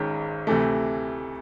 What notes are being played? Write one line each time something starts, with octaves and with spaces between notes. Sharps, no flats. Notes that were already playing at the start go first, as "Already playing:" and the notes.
Already playing: G#1 G#2 D#3 G#3 C#4
D2 C3 E3 A3